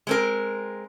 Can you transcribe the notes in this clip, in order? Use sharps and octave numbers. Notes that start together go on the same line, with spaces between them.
G#3 C4 A#4